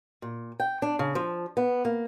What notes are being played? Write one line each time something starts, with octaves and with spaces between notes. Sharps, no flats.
A#2
G5
D4
C#3
F3
B3
A#3